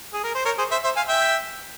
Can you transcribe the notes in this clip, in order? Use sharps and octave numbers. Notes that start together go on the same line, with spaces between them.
G#4
A#4
C5
A#4 C#5
G#4 C5
C5 E5
C5 E5
F5 G#5
E5 G5